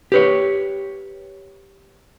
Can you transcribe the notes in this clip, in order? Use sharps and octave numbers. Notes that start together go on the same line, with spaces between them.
G4 B4 C#5